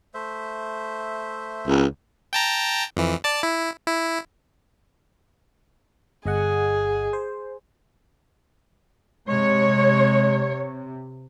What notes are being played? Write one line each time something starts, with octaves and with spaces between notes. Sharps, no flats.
A3 C5 E5
C#2
G5 A5 A#5
F2 E3
D5 A5
E4
E4
G1 G#4 D#5 F#5
C5
C3 G#3 C#5